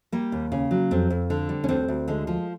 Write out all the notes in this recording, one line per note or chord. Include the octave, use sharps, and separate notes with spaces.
G3 A#3
D#2
C#3
F#3
F2 C4
F2
D3
G3
C#4
D2 C4
D2
D3 G#3
F3